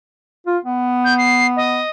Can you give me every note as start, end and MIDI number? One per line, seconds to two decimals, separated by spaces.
0.47 0.58 65
0.65 1.80 59
1.04 1.16 91
1.18 1.47 96
1.56 1.90 75